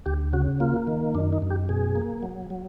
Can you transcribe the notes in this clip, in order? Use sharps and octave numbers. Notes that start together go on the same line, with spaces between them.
D2 G4
C#3 F#4
A#3 F4
D#3
F#2 D4
D#4
F#2
G4
B2 G#4
A#3
F#3
F#3